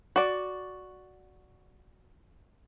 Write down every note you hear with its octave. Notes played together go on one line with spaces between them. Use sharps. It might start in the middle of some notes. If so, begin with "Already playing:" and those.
F#4 D5